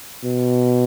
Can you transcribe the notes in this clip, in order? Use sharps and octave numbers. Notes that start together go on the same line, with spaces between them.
B2